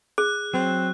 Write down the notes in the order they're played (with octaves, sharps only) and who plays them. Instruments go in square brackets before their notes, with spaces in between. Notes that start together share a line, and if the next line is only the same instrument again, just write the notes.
[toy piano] G#4 [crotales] F#6
[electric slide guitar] F#3 [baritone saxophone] C4